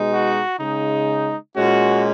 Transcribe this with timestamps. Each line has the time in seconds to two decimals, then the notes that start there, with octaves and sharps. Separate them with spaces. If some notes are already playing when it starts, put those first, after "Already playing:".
Already playing: B2 G#3 D#4
0.12 F#4
0.59 C#3 G#3 D#4
1.54 A#2 G#3 C#4 F#4